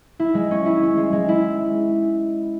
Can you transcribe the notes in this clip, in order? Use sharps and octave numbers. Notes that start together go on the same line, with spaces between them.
E4
G#3
C#4
E4
C#4
G#3
G#3
E4